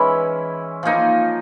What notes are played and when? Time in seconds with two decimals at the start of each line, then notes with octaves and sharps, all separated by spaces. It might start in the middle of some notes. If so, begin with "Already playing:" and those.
Already playing: E3 G#3 C#4 E4
0.83 F3 A#3 D#4